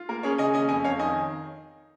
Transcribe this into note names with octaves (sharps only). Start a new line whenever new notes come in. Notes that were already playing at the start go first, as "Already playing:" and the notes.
Already playing: F4
A#3 A#4
C#4 G#4 C#5
C#3 D#5 G#5
C#4 D#5 G#5
F2 D#5 G#5
F2 C#5 F5
D#3 D#5 G#5